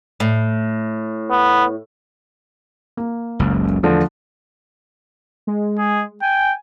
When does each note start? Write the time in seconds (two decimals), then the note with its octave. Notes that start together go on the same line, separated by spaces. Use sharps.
0.20 A2
1.30 B3
2.97 A#3
3.39 F#1 C#2
3.83 E2 D3 F3 A3
5.47 G#3
5.78 G#4
6.22 G5 G#5